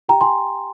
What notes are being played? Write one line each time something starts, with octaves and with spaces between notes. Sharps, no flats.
G4 G5 A#5
G#5 C6